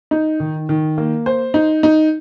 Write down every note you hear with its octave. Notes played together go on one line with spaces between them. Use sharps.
D#4
D#3
D#3
A#3
C5
D#4
D#4